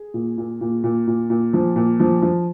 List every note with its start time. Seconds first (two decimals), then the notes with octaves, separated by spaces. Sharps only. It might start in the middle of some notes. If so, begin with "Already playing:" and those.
Already playing: G#4
0.14 A#2
0.38 A#2
0.61 A#2
0.84 A#2
1.07 A#2
1.30 A#2
1.53 F3
1.76 A#2
2.00 F3
2.22 F3